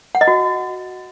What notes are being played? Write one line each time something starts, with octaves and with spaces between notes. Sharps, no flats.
F#5
D#5
F#4